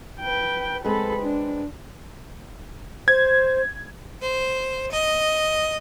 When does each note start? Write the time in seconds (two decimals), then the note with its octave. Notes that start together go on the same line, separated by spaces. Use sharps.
0.20 B4 G5
0.85 G#3 C4 A4 B4 B5
1.23 D4
3.08 C5 G#6
4.20 C5
4.91 D#5